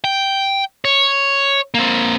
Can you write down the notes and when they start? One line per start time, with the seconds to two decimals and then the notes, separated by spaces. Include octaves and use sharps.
0.04 G5
0.85 C#5
1.74 A#3 C4